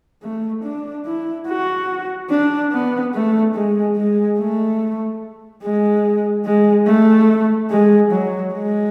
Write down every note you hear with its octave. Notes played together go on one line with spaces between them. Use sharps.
A3
D4
E4
F#4
D4
B3
A3
G#3
G#3
A3
G#3
G#3
A3
G#3
F#3
G#3